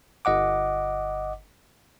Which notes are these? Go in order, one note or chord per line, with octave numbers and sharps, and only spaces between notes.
G1 D#5 F#5 D6